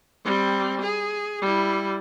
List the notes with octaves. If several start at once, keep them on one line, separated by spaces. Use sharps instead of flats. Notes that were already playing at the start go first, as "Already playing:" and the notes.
G3 C4
G#4
G3 E4